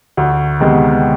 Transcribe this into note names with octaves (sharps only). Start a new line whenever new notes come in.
D2
C3 D#3 G#3 B3